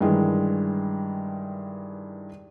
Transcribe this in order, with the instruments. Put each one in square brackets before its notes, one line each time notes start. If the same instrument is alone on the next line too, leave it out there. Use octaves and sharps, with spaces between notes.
[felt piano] G2 D#3 E3 G#3